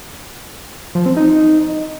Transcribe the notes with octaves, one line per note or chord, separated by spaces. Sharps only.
F3
C4
D#4